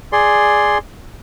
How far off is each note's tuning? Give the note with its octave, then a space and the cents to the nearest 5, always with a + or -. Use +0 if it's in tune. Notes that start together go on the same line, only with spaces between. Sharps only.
G#4 +0 D5 +0 C6 +0